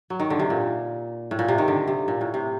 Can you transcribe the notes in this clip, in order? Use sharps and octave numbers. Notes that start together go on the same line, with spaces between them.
F#3
D#3
D3
C3
A#2
A2
A#2
C3
D#3
D3
C3
A#2
A2
C3